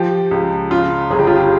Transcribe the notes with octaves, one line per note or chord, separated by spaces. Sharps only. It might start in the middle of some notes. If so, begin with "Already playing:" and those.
Already playing: F3 G4
C#2
C#3 F4
G1 G#4
G4
F4
G4